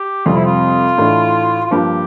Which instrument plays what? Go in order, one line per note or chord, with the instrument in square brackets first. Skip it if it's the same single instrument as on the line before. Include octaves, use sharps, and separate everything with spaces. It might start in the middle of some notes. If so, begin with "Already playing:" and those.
Already playing: [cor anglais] G4
[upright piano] F2 C3 G3 C4 [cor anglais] F4
[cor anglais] E4
F4
[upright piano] A2 E3 A3 D4
[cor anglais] F4
[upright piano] G2 F3 A#3 [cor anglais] G4